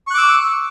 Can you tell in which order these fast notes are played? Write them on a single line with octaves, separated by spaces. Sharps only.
C#6 F#6 D6 E6